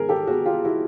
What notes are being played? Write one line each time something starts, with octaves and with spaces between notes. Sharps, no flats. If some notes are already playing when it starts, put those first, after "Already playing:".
Already playing: G#2 D#3 G#4 A#4
G4 A4
F#4 G#4
F4 G4
E4 F#4